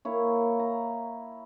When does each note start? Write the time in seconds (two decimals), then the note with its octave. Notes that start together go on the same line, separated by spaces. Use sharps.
0.05 A#3 E4 C#5
0.59 A#5